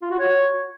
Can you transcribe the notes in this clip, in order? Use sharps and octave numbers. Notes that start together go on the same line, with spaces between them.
F4
F#4
C#5